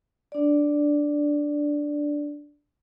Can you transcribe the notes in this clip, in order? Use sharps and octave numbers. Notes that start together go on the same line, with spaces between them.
D4 D5